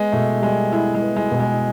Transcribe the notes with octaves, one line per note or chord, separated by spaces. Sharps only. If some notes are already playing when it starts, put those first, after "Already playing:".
Already playing: G#3 B3
B2 A3
G3 G#3
G#3 E4
G#3
B3
G#3
B2
G#3